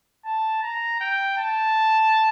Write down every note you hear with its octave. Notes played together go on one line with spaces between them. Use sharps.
A5
A#5
G5
A5